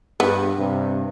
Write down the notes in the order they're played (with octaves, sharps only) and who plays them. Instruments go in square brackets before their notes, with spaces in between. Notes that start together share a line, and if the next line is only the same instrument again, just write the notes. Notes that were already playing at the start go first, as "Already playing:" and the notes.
[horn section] G2 [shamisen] B3
[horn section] G2 C3